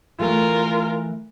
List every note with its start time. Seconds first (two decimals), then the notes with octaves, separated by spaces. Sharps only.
0.20 E3 A3 F4 A#4